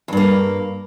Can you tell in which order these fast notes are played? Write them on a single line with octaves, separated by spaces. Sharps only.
E2 G2 A#3